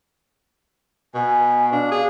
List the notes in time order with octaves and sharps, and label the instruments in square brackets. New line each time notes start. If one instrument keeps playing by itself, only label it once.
[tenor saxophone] B2 [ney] G#5
[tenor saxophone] D4 [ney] F5
[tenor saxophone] G#4